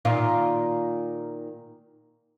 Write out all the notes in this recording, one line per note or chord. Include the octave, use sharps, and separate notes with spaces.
A#2 D#3 F4